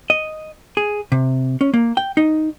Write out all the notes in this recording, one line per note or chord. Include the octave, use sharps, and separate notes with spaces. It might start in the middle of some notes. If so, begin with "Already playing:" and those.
D#5
G#4
C3
C#4
A#3
G5
D#4